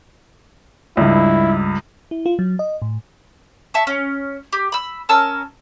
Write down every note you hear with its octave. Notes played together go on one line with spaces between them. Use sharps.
C#2 G2 E4
E4
F4
F#3
D#5
A2
E5 A5 C#6
C#4
G4
B5 E6
C#4 A#4 A5 E6